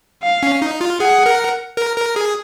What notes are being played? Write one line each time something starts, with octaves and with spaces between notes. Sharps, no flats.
F5
C#4
D#4
F4
G#4 F#5
A#4
A#4
A#4
G#4